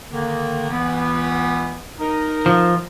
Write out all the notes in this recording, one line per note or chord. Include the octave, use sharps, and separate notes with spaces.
D3 D#3 A#3
C#2 E3 B3
D#4 A#4
F3